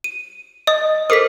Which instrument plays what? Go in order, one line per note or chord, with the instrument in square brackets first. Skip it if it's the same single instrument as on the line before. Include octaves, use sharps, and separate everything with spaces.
[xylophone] D#7
D#5 D#6
[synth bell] A4 A#4 C5 [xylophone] D#6 B6